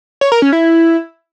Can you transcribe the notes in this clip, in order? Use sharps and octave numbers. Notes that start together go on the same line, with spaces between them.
C#5
A#4
C#4
E4